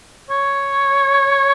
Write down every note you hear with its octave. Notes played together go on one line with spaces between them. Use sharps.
C#5